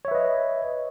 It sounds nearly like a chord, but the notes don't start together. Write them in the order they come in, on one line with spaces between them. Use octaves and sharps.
C#5 E5 B4 D#5